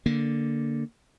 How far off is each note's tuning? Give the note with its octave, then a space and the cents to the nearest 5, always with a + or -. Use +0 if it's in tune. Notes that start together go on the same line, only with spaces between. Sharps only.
D3 -5 A#3 +0